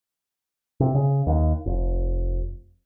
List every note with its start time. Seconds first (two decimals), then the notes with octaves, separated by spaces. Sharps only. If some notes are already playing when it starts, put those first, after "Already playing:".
0.80 C3
0.95 C#3
1.27 D#2
1.66 F1